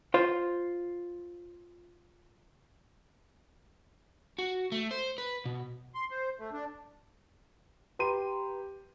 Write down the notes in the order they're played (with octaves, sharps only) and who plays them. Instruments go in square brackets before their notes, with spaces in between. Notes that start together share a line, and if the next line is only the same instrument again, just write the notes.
[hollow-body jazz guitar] F4 C5
[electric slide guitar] F#4
A3
C5
B4
B2
[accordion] C6
C5
A3
D4
[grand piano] G4 D#7 [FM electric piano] B4 A#5 C6